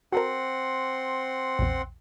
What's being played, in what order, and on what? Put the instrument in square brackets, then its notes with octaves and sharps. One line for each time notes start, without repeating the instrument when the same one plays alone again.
[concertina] C4 F#5 C6 [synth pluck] F#4 A4 A#4
[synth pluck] A#1 E2